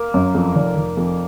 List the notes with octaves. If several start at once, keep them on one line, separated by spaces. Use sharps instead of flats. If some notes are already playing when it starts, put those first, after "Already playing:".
Already playing: A#3
F#2
F2
F1
F1
F2